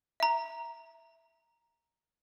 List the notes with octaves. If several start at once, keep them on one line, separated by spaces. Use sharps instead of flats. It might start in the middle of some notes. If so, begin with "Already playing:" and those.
E5 A#5